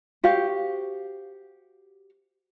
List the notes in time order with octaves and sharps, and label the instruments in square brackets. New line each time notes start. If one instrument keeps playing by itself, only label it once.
[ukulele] F#4 G4 C5 F5